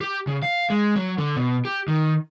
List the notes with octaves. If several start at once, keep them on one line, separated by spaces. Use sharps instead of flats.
G4
C#3
F5
G#3
F#3
D3
B2
G4
D#3